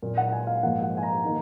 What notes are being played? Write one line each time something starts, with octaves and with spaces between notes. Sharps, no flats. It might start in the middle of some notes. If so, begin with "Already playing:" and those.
A#2 F#3 A#3
F#5
G#5
F5
G#2 F3 A#3 D#4 F#5
F#5
G#5
A#5
D#3 A#3